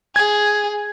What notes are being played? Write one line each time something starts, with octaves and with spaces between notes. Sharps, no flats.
G#4 G#6